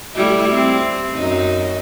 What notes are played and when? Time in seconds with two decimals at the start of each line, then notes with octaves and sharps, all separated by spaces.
0.15 G3 A3 E4
0.53 C4
1.13 F#2 D#4